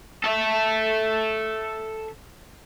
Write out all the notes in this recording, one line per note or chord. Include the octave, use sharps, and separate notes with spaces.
A4 E5